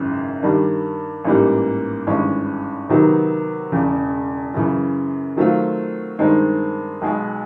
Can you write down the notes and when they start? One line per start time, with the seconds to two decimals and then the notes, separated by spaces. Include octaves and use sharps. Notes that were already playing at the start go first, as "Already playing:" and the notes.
Already playing: G#1 F#2 C#3 E3
0.43 G2 D#3 G3
1.25 A1 G#2 E3 G3 A#3
2.07 G#1 G2 E3 G#3 C#4
2.89 C3 D#3 F#3 B3 D#4
3.72 E1 E2 C#3
4.54 F#2 C#3 E3
5.36 D#3 F#3 A3 C4 F4
6.19 G2 D#3 G#3 C4 D#4
7.02 B1 B2 G#3